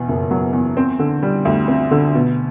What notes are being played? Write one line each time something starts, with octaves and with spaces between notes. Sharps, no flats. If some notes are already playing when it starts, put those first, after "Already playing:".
Already playing: E2 B2
F#1
F#3
E2
C4
D3
G3
D2
C4
D3
B2